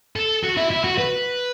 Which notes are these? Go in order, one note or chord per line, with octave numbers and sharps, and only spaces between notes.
A4
F#4
E4
E4
F#4
B4